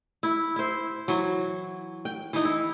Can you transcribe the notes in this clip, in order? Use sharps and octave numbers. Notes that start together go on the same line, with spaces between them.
E4
E4 C5
E3 F#3
G5
E3 D#4
E4